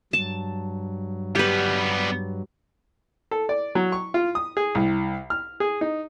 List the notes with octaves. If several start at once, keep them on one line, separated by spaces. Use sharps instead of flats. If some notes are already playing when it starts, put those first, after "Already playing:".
G2 F#3 A5
G3 B3 G4 B4
A4
D5
F#3
C#6
F4
D#6
G#4
C2
F6
G#4
D#4